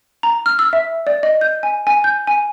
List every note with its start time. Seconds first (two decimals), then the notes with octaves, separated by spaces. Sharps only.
0.23 A#5
0.46 F6
0.59 E6
0.73 E5
1.07 D5
1.23 D#5
1.41 G6
1.63 G#5
1.87 G#5
2.04 G6
2.27 G#5